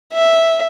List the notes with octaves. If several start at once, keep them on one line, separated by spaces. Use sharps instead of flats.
E5